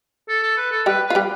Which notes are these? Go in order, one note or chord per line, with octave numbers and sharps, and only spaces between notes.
A4
A4
B4
A4
G3 G4 B4
F4 B4
G3 G4